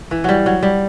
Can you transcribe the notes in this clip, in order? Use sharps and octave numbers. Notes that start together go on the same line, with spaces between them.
E3
F#3 G3
F#3
G3